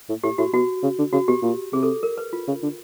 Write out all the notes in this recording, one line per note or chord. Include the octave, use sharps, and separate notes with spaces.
A2
A2 G4
A2 F#4
B2 F#4
C#3
D3
C#3 F#4
B2 G4
A#2
C3 G#4
A4
A#4
B4
F4
C#3
D3